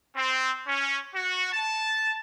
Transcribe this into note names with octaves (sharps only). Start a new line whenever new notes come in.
C4
C#4
F#4
A5